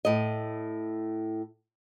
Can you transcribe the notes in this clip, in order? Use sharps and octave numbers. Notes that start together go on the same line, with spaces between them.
A2 D#5